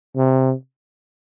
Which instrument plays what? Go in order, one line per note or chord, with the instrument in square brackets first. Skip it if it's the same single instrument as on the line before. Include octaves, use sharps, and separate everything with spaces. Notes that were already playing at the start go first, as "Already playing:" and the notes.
[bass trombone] C3